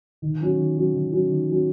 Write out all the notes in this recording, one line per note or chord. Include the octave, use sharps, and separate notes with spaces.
D#3
F#3 C#4 F#4
D#3
F#3 C#4 F#4
D#3
F#3 C#4 F#4
D#3
F#3 C#4 F#4